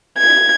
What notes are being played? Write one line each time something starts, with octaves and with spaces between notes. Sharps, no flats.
G#6